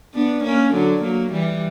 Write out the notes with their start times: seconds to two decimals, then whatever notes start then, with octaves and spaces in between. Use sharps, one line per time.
0.14 B3 D4
0.44 A#3 C#4
0.73 D3 F#3
1.03 F#3 A#3
1.32 E3 G3